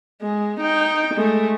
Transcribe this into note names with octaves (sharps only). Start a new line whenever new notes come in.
G#3
D#4 G5
G#3 A3